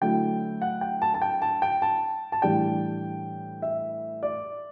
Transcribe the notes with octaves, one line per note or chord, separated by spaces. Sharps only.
D3 F#3 A3 E4 G5
F#5
G5
A5
A5
G5
A5
G5
A5
A5
A2 E3 G3 D4 G5
E5
D5